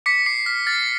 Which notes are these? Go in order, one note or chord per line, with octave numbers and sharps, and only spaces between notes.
D6 B6 C#7
D6 C7
F6 B6
F6 A6